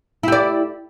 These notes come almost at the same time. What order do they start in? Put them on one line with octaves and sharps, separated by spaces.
E4 G4 D5